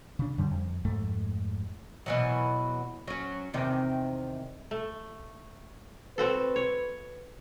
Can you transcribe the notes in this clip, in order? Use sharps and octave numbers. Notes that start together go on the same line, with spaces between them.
C#3 D4
F#2 D3 G3
F2
F2 G#2 A3
B2 E3 F#3
F#3 C#4
E2 C3 D#3
A3
C4 F#4 A4 B4
C#5